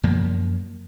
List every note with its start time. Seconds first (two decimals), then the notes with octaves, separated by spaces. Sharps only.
0.03 F#2 F3 A#3